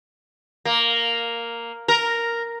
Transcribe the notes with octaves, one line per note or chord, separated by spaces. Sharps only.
A#3
A#4